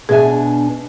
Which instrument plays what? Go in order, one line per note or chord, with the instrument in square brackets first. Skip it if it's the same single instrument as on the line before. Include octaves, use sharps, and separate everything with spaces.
[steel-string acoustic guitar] B2 D4 G#5 [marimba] G#4 E5